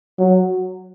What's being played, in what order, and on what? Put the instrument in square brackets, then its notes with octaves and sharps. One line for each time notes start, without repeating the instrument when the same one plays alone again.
[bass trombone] F#3